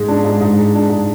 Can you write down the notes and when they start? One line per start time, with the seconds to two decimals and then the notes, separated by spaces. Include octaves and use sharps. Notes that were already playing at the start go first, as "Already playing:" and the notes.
Already playing: G#2 G#3
0.08 D4
0.25 G#2
0.41 G#2
0.58 G#3
0.74 D4
0.90 G#2